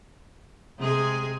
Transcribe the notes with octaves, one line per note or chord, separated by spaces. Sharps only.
C3 G#3 G#4